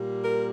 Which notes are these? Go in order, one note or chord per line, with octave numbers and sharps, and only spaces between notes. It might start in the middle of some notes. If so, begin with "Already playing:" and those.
Already playing: A#2 G3 A#3
A#4